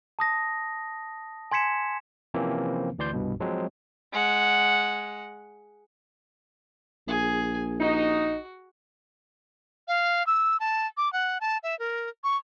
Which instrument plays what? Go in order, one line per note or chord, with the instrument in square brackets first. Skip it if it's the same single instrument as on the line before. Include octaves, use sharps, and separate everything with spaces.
[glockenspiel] A5 D#6 A#6
G#5 C6 G#6 B6 C#7 E7
[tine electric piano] C3 E3 F3 A#3 C4 C#4
D2 E3 D5 C6 G6
C2 G2 B2
F3 F#3 G#3 C4
[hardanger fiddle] G#3 F#5
[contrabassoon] A#1 [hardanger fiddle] G#4 G#5
[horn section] D#4 [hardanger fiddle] F#4
[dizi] F5
E6
A5
D6
F#5
A5
E5
A#4
C#6